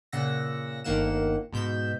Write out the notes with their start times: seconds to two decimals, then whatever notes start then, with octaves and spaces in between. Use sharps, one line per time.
0.12 A#2 C#3 F#5 E6 A#6
0.84 G1 D#3 A#3 F#5 E7
1.53 G#2 B2 G6 B6 E7